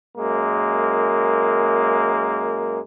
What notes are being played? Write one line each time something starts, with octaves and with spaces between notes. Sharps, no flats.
F#2 G#3 A#3